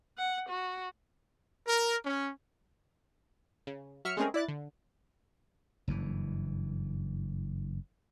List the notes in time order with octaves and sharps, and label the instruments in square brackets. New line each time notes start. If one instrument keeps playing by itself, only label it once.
[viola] F#5
F#4
[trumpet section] A#4
C#4
[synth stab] C#3
F#3 E5 F6 C#7
G#3 A3 C4 C#4 G#4 A#4
E4 D5 F#6 A6
D3
[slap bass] F#1 G2 E3